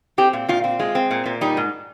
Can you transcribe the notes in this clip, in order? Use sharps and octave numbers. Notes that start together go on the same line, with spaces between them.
C4 G4
A#2
A#2 F4
C4
G#3 F4
C4
A#2
A#2
G3 D#4
G#2